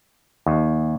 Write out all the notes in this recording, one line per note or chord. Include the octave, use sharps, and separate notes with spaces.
D#2